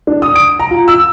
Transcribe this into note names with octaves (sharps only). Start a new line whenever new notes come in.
D4
D#6
D7
A#5
F4
E6